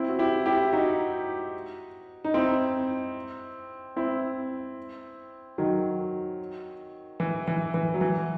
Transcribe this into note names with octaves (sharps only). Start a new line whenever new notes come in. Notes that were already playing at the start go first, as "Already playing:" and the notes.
Already playing: C4 E4
F#4
E4 G4
E4 G4
D#4 F#4
D#4
C4 E4
C4 E4
D#3 F#3
E3
E3
E3
F#3
E3